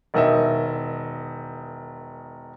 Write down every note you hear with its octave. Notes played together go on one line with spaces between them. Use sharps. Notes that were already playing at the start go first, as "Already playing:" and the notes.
E1 D#3 D#5 E5